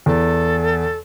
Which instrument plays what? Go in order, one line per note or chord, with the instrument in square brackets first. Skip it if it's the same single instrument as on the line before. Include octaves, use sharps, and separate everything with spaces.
[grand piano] E2 [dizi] A4